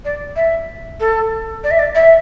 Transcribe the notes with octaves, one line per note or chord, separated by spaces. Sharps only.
D5
E5
A4
D5
E5
D5
E5